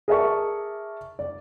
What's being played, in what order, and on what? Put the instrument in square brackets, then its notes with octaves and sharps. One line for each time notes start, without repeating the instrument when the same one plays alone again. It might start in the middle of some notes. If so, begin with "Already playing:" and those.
[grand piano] G#4 A#4 D5 E5 A5 C#6
D5